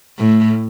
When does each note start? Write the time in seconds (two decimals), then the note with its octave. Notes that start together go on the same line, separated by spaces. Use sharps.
0.18 A2